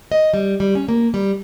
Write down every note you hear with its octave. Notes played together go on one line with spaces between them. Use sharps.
D#5
G3
G3
C#4
A#3
G3